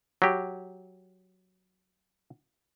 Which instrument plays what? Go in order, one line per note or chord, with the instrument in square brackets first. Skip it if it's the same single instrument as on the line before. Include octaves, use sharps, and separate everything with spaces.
[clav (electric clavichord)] F#3 G4